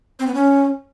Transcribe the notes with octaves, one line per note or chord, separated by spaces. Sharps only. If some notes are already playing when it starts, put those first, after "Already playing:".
C4
B3
C#4